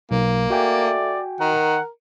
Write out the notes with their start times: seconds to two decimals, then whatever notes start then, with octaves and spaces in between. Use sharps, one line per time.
0.11 B1 A#3
0.50 A3 F#4 D5 G5 G#5
1.40 D#3 A#4 F#5